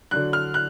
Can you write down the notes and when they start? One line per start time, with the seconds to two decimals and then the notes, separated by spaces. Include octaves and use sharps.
0.11 D3 F#3 D4 F#6
0.33 F6
0.54 F#6